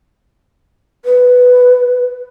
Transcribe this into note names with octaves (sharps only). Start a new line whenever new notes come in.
B4